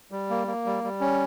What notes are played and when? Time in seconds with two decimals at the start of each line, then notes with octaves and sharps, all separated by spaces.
0.11 G3
0.30 A#3
0.48 A#3
0.66 G3
0.84 G3
1.01 C#4